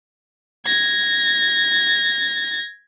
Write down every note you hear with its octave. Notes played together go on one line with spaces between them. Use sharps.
G#6 A#6